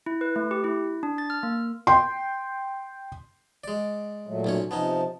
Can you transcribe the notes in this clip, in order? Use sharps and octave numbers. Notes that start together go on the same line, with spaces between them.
E4
B4
A3
G4
E4
D4
A6
F6
A#3
G5 C6
G#3 D5
A#2 F#3 A3
B1 C#4 C#5
C3 F3 B3 C#4 D#4 A5